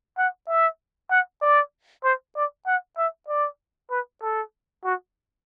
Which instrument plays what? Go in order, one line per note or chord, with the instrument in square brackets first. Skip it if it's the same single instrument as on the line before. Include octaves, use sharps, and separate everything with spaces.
[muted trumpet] F#5
E5
F#5
D5
C5
D5
F#5
E5
D5
B4
A4
F#4